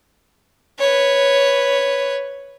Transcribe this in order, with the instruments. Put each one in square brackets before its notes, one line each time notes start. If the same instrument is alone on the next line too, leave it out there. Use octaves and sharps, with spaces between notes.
[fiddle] B4 C#5